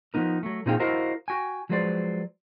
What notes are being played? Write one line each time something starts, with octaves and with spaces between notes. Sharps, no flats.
F3 F#3 B3 D#4 A#4
F#3 A3
A#2 C4 D#4 G#4 F5 G5
E4 F#4 A#4 C5 D#5 F5
F#4 G5 G#5
F3 F#3 G#3 B4 C5 D5